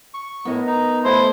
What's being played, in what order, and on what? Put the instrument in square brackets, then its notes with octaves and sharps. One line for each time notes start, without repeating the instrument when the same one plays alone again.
[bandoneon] C#6
[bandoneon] A2 [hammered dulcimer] B3 A#4 D#5
[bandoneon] D#4
[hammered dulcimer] A3 F#5 [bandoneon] E4 [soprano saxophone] C5